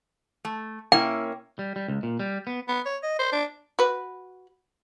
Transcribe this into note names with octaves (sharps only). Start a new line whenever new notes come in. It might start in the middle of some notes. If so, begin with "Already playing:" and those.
A3
A#3 C#4 E4 G5
G3
G3
C#2
A#2
G3
B3
B3
C#5
D#5
C5
D4
F#4 B4